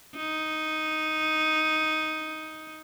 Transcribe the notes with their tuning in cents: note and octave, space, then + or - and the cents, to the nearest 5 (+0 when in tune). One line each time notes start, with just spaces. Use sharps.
D#4 +5